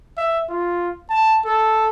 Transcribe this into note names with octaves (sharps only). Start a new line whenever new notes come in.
E5
F4
A5
A4